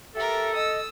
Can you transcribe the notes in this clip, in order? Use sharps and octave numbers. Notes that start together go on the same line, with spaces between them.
G4 A4 A#4 E5
D#5 D#6 E6